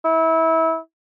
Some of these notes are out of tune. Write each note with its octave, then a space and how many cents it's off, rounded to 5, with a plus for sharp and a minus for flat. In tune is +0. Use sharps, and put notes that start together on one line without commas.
E4 -25